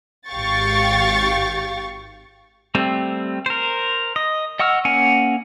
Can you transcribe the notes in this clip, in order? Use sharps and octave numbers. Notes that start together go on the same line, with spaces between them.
G#1 G4 F5 G5 C#6 A6
G3 A3 C4
A#4 C5
D#5
D#5 F#5 C#6 E6 F6
A#3 C#4 F#5 G#5